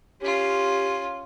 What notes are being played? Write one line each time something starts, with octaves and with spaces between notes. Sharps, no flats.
C#4 F4 G4